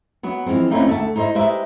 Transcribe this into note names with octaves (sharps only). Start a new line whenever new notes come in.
F#3 B3 F#4
E3 F3 G#3 C4
A3 A#3 C4 C#4 D#4 E4
D2 A3 E5 F#5 A5
D#4 E4 C5 D#5
G#3 D#4 G4 B4 C5 E5